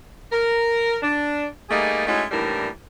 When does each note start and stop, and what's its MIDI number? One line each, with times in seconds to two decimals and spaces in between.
0.32 0.96 70
1.02 1.46 62
1.70 2.04 55
1.70 2.04 57
1.70 2.04 58
1.70 2.04 63
1.70 2.04 68
2.07 2.24 56
2.07 2.24 57
2.07 2.24 61
2.07 2.24 63
2.07 2.24 64
2.07 2.24 66
2.31 2.68 39
2.31 2.68 45
2.31 2.68 52
2.31 2.68 55
2.31 2.68 62
2.31 2.68 70